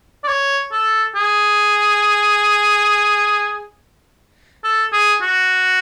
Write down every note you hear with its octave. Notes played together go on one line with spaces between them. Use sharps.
D5
C#5
A4
G#4
A4
G#4
F#4